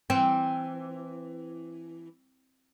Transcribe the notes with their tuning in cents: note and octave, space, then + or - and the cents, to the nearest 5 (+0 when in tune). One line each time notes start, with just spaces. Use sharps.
E3 +15 C4 +0